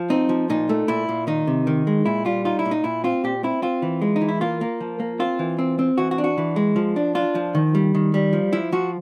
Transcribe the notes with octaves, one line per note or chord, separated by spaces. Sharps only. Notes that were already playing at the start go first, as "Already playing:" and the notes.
Already playing: F3
C4 D#4
F3
A#2 D#4
A3
A#2 E4
A#2
D#3 D#4
C3
D#3
G#3
A#2 E4
G3 F4
D#4 F4
E4
A#2
D#4
A#2 E4
C4 F4
A#2 G4
C4 E4
C4 F4
E3
G#3
D#4
E3
E4
A#3 F4
A#3
F3
A#3
C4 F4
E3
C4
C4
E3 F#4
F#4
D4
F#4
E3
G#3
F3
D4
D4 F4
F3
D#3
G3
D#3
G3
F3
F3 E4
F3 F#4